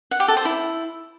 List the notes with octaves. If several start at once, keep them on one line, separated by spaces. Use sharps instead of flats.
F#5
G4
A4
C5
E4